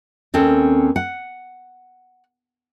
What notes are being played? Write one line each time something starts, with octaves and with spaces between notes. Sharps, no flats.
D#2 C4 C#4 A4
F#5